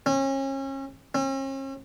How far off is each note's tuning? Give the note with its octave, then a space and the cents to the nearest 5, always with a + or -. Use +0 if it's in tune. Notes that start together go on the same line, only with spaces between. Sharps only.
C#4 -35
C#4 -45